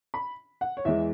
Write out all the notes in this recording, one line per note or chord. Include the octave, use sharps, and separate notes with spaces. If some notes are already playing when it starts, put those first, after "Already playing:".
B5
F#5
C#5
E2 E3 G#3 E5